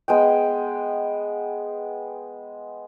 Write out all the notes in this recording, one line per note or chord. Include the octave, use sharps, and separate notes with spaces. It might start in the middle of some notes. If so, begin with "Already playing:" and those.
G#3 B3 G5